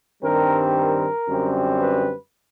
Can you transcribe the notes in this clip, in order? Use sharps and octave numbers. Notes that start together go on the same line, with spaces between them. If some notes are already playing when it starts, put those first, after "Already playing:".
G2 D#3 G3 C4 A#4
A#4
F#2 D3 G3 C4
B4